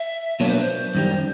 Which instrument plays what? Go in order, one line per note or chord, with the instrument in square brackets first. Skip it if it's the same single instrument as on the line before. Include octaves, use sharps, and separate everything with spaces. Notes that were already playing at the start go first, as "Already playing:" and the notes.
Already playing: [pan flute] E5
[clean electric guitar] B2 F#3 A#3 D4 [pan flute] C#5
[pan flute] C5
B4
C5
[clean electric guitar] F#2 D#3 G3